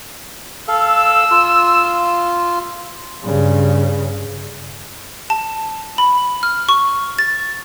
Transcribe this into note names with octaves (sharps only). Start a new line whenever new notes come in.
A4 F5 E6
F4
G2 C#3
A5
B5
F6
C#6
A6